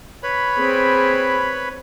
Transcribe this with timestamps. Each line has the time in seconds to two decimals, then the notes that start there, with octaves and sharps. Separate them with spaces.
0.23 B4 C#5 B5
0.58 C4 G#4